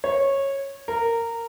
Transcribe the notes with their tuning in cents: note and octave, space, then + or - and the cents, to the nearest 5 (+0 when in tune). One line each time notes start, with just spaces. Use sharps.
C#5 -15
A#4 -15